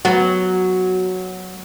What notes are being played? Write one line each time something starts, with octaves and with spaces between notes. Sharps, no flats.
F#3 B3 F#4